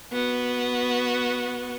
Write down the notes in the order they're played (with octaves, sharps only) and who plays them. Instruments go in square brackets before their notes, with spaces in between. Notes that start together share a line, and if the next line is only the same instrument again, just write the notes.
[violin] B3 F#4